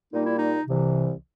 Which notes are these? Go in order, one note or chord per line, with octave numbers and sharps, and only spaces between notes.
A#2 G3 A#3 D#4
E4
D#4
C2 C3 E3